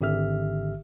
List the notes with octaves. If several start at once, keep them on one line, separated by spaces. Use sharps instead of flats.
G#1 D3 G4 E5 F6